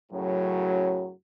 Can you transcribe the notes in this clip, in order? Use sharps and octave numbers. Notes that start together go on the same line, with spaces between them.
F#2 A2 C#3 F#3